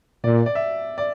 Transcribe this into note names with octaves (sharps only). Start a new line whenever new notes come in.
A#2 D5
D5
E5
D5